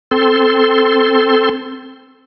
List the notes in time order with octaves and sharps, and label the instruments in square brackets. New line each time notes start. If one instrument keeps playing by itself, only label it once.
[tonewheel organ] C4 A4 C6